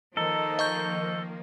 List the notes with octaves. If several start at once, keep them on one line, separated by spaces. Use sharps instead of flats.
D#3 F3 A#3 D#4 A4
D#5 C#6 G6